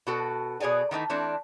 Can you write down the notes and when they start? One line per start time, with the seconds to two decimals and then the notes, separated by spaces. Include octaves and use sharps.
0.07 B2 F#4 A4
0.60 B2 G#4 C#5 D5 G#5
0.91 D#3 E3 A3 D#4
1.10 E3 A3 C4 D4